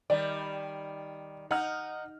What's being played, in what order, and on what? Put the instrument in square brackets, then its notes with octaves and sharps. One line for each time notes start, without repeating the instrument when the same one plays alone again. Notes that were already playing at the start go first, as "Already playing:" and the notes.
[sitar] D#3 G3 [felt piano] D5
[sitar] D#4 [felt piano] F#5 F6